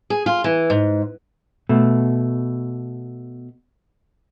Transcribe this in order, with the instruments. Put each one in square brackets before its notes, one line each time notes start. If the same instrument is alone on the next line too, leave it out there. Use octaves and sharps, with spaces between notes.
[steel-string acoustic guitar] G#4
F4
E3
G#2
[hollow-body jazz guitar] B2 A3